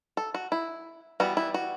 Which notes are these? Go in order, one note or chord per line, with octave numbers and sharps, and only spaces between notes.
A4
F#4
E4
E3 G3 B3 F#4
E4
F#4